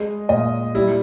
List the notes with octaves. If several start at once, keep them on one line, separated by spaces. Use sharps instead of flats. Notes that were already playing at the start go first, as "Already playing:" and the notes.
Already playing: G#3 D#5
A#2 D#5
G3 E4